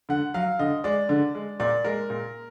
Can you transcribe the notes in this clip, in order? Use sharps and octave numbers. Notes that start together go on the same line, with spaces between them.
D3 F#5
F#3 F5
D3 D#5
G#3 D5
D3
G#3
A#2 D5
G#3 A#4
A#2